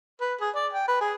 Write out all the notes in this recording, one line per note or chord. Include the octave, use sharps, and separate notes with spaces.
B4
G#4
D5
G5
B4
G#4